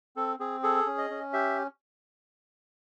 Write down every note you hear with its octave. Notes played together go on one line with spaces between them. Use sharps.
C4 A4
C4 G#4
G#4 A4
C#4
D#5
C#4
G4 E5